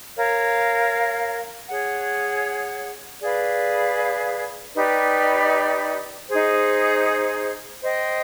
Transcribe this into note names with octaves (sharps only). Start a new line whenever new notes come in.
A#4 C#5 F5
G#4 C#5 F#5
G#4 B4 D5 F5
D#4 G4 B4 D5
D#4 G#4 C5
C5 D#5 G5